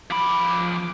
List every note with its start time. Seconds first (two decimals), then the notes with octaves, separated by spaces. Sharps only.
0.10 F3 B5 D6